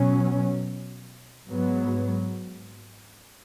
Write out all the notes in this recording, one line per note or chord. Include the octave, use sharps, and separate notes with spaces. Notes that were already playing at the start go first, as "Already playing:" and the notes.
Already playing: B2 F#3 C#4
G#2 F#3 B3